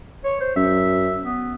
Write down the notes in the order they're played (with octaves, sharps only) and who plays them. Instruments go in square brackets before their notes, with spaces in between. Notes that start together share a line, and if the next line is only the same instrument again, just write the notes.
[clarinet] C#5
C5
[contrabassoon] F#2 [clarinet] E5
[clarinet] B3